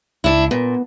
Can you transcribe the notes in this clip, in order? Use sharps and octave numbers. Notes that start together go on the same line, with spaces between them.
C#2 D4 E4
A#2 B3